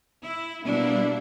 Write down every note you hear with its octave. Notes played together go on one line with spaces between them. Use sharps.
E4
B2 G3 A#3 D4 E4